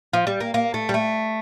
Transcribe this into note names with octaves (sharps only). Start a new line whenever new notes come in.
F3
G3
A#3
A#3
A3
G3
A3